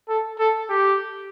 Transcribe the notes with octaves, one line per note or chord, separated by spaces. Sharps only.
A4
A4
G4